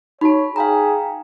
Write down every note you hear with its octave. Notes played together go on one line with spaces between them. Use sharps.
D#4 F#4 C#5 A5 B5
G#4 F5 G5 A#5